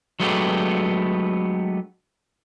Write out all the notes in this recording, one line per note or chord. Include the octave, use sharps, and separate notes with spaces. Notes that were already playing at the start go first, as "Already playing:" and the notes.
F#3 G#3 A3 B3 D4 G4